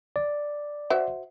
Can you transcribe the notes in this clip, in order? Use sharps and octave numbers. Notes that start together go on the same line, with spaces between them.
D5
F#4 C5 E5